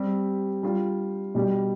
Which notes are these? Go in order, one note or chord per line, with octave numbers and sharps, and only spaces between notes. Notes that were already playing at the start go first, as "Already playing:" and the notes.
Already playing: G3 C4 G4
G3 D4 F4
B2 G3 D4 G4